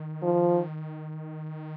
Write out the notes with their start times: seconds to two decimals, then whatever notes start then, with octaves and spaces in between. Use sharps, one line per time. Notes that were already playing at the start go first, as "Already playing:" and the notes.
Already playing: D#3
0.23 F3